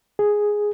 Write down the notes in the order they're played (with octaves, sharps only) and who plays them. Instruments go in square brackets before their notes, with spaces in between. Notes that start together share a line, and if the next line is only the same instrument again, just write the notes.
[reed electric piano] G#4